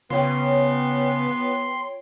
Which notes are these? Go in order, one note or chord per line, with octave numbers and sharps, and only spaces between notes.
C#3 B3 F4 C#5 G5 C6